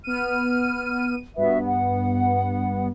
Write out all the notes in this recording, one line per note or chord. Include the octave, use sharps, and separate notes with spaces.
B3 F6 D#7
G2 B3 F#4 E5
F#5